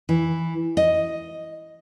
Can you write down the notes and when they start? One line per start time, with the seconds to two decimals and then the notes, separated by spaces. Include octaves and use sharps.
0.09 E3
0.77 D#5